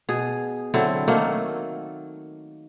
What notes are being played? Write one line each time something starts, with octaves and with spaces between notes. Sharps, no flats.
B2 G#4
D3 F#3 C4 E4
D#3 F#3 A3 A#3